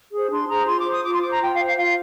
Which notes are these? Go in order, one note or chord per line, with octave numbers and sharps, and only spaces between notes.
G#4 C5
D4 C6
G#4 C5 A#5
F4 C6
D6
C5
D#6
F4 D6
C6
C5 D6
A#5
F4 G5
F5
C5
F5
F4 F5